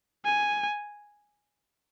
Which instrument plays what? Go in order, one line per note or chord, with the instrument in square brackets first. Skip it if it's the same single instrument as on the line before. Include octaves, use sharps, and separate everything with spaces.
[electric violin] G#5